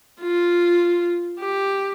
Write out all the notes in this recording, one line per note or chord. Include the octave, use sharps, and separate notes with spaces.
F4
G4